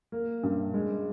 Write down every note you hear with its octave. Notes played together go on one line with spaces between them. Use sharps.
A#3
G2
G#3